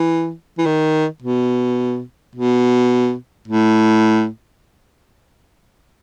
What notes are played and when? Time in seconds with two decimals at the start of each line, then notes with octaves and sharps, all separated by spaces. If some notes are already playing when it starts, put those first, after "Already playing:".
Already playing: E3
0.58 E3
0.66 D#3
1.22 B2
2.35 B2
3.48 A2